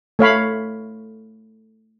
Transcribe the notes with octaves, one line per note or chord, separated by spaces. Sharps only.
A3 C#5 F5 B5